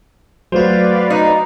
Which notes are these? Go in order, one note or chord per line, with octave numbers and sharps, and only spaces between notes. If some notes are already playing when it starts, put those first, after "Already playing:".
F#3 A3 F#4 B4 C5 D5 F5
D#4